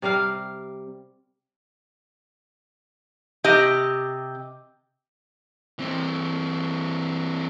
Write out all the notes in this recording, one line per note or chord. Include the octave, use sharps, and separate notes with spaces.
C3 G3 A#4 F5
C3 G4 D#5
E3 C4